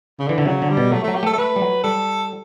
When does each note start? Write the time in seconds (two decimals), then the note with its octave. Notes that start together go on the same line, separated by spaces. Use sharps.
0.19 C#3
0.27 D3 E3
0.38 D3 E3
0.46 C#3 F#3
0.62 D3
0.70 G3
0.77 B2
0.92 F#3 A3
1.04 F#3 A3
1.15 G4
1.23 A3 A4
1.33 A4
1.38 A3 B4
1.56 G3
1.61 F#3
1.83 G3 A4